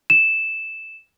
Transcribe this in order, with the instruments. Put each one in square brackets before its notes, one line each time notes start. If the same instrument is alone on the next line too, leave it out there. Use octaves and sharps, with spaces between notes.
[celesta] E7